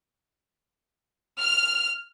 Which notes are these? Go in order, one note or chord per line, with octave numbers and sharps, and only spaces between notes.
F6